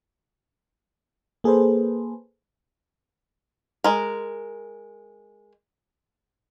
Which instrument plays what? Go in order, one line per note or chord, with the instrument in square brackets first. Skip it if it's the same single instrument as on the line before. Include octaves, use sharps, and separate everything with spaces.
[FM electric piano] A#3 G#4 A4 B4 C5
[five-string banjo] G#3 A#4